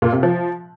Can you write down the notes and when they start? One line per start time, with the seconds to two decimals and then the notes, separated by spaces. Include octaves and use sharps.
0.02 A#2
0.12 C3
0.23 F3